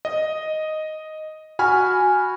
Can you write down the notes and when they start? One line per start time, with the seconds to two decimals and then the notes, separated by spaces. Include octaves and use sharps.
0.05 D#5
1.59 F#4 G#5 B5 F6